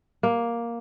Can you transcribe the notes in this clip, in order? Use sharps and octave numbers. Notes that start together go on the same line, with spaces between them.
A#3